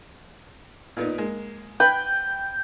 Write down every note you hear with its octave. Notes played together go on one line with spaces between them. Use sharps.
A#2 B3 D#4
G#3 A#3
B4 G5 B5